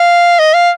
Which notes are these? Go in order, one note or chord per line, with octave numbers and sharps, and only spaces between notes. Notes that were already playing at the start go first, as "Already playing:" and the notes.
Already playing: F5
D#5
F5